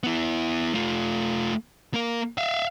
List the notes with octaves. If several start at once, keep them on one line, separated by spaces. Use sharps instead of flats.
B3 E4
A3 F4
A#3 A#4
E5 F5